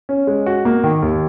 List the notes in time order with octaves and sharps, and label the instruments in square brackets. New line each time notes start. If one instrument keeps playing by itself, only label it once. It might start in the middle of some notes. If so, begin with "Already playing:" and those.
[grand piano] C#4
G#3
F#4
A#3
D#3
D#2